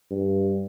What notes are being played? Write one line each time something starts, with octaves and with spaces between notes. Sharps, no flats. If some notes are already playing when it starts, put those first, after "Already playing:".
G2